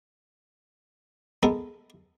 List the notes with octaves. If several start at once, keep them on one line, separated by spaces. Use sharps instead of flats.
G#3 B3 A4 A#4